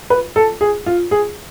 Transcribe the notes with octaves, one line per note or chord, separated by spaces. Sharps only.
B4
A4
G#4
F4
G#4